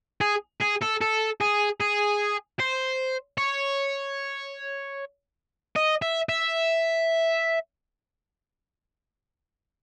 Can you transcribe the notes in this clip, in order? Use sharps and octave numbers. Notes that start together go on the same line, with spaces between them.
G#4
G#4
A4
A4
G#4
G#4
C5
C#5
D#5
E5
E5